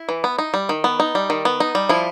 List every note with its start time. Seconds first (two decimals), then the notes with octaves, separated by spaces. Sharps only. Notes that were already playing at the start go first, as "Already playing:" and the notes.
Already playing: E4
0.09 E3
0.24 B3
0.38 D#4
0.54 G3
0.69 D#3
0.84 B3
1.00 D#4
1.15 G3
1.30 D#3
1.45 B3
1.60 D#4
1.75 G3
1.89 F3 E4